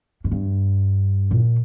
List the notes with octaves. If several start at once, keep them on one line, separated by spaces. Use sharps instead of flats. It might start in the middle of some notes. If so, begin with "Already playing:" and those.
G#2
G2
A#2